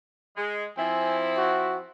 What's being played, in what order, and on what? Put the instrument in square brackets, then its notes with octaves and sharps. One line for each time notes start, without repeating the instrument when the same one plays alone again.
[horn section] G#3
[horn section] F3 C4 E4 [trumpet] G#5
[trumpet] F#4